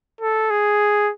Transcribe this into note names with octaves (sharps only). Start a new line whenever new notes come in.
A4
G#4